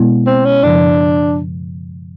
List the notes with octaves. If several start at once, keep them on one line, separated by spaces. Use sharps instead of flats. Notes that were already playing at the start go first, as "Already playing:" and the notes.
Already playing: B2 G#3 B3 E4
C4
C#4
F#2 C#3 F3 D4